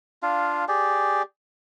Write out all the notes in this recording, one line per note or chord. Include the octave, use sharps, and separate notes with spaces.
D4 F4 F5
G4 G#4 D5